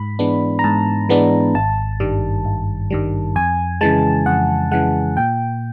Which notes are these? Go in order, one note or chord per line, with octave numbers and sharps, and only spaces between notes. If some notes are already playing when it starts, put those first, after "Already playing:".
Already playing: G#2 B5
E3 G#3 B3 D4
A#5
G#2 A5
E3 G#3 B3 D4
G#1 A5
G2 D#3 G3
G#1
G2 D#3 G3
F2 G#5
C#3 E3 G#3 A5
F2 F#5
C#3 E3 G#3 F#5
A#2 G5